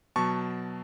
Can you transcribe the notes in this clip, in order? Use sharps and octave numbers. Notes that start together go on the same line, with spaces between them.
B2 F#3 A5 C#6